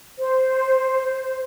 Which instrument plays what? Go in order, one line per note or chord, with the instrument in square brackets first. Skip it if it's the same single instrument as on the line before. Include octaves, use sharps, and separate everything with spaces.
[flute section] C5